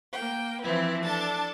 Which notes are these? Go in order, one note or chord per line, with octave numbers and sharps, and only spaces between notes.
A#3 G5
E3 F3 C4 E4 B4
D4 A4 A5